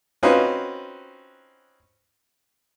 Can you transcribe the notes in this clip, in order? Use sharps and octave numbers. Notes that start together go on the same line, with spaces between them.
C4 C#4 D#4 F4 F#4 B4